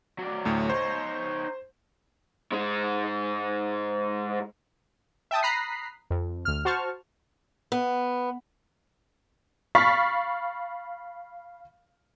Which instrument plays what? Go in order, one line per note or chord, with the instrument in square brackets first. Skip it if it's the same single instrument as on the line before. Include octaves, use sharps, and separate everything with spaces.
[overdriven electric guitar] F#3 D5
[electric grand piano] D2 A2
[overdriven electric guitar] D#4 C#5 [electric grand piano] C5
[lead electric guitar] G#2 G#3
[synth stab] E5 G5 A5 D#6
A#5 B5 D#6 F#6 B6 C7
F2
D2 F6
F#4 C5 A5 C#6 F6
[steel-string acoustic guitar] B3
[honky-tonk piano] F5 B5 C#6 F6 A6 B6